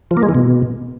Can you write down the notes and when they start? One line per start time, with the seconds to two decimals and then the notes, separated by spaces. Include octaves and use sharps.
0.11 F3
0.17 A#3
0.23 G#3
0.29 E3
0.35 B2